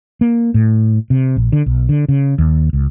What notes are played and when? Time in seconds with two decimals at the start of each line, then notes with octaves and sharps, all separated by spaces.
0.21 A#3
0.54 A2
1.10 C3
1.36 A#1
1.52 D3
1.66 B1
1.89 D3
2.08 C#3
2.38 D#2
2.73 C#2